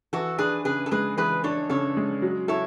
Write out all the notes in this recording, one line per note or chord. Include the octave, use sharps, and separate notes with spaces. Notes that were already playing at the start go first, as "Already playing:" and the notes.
E3 F#4 A4
D4 G#4 B4
C#3 G#4 B4
A4
G#3 G#4 B4
E3 G#4 B4
D4 A4 C#5
C#3 A4 C#5
G#3
F#3
E4 A4 C#5